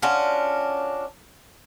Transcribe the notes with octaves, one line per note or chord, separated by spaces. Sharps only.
C#4 D4 F4 F#4